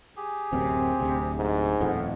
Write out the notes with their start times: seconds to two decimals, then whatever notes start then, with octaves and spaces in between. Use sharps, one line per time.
0.16 G4 G#4
0.53 D1 F#2 C3 C4
1.00 D1 D2 C3
1.37 G#2
1.80 D#1 F2 A2 B3